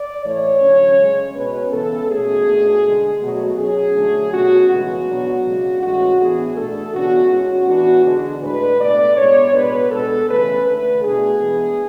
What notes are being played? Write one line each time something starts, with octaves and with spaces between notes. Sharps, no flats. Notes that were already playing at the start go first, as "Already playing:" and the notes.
Already playing: D5
A2 E3 A3 C#5
D3 F#3 C#4
C#3 G#3 C#4
B2 G#3 C#4 B4
C#3 E3 B3 A4
B2 A3 C#4 G#4
B2 A3 D4
D3 G#3 D4
B2 F#3 A3 F#4
B2 F#3 C#4 G#4
D3 F#3 A3 D4
B2 A3 C#4 F#4
C#3 E3 G#3 B3 F#4
B2 F#3 B3 D4
C#3 G#3 D4
A2 E3 G#3 C#4 F#4
E3 B3 D4 G#4
B2 A3 D4 A4
C#3 E3 B3 D4 F#4
A2 G#3 C#4 F#4
E3 B3 D4 F#4
D3 G#3 D4
A2 G#3 D4 B4
B2 A3 D4 D5
A2 G#3 B3 D4 C#5
B2 G#3 B3 D4 B4
B2 G#3 B3 D4 A4
C#3 E3 A3 C#4 B4
D3 A3 D4 B4
B2 A3 D4 G#4
E3 G#3 B3 D4